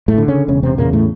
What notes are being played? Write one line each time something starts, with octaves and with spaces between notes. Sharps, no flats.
A2 A3
D3
C#3 C#4
E1 C#3 C#4
C3 C4
E2 A#2 C#3 A#3
A2 A3